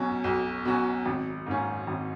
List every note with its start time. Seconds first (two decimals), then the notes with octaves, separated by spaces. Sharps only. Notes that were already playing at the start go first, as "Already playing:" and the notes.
Already playing: B1 B2 F#3 C#4 F#4
0.24 B1
0.65 B2 F#3 C#4 F#4
1.06 G#1
1.46 G#2 D#3 A#3 C#4
1.87 G#1